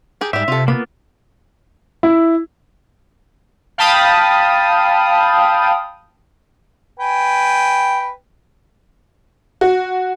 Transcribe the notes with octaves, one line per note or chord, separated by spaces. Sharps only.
G4 G#4 A#4
G#2 G3 G4 E5
C3 F4 A4
A#3 B3 F4 B5
E4
F5 G5 A5 B5 D#6
B4 G5 G#5
F#4